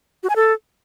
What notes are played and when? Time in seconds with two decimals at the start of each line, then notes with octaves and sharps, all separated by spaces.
0.23 F#4
0.30 G#5
0.36 A4